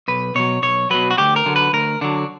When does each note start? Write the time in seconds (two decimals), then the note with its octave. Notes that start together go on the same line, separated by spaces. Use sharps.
0.08 B1 B4
0.35 B2 F#3 C#5
0.63 B1 C#5
0.91 B2 F#3 B4
1.11 F#4
1.18 D2 G4
1.36 A#4
1.46 D3 F#3
1.56 B4
1.73 D2 A#4
2.01 D3 F#3 D4